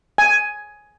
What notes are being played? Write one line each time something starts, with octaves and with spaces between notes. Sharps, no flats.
G#5